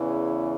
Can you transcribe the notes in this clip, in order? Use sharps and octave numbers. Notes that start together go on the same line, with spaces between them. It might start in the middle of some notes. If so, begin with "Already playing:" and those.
Already playing: E2 C#3 E3